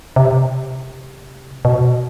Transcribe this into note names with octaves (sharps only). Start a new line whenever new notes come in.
C3
B2